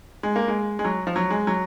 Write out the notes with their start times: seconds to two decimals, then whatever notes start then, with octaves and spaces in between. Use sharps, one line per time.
0.23 G#3
0.36 A#3
0.48 G#3
0.79 G#3
0.84 F#3
1.07 F3
1.16 F#3
1.30 G#3
1.47 F#3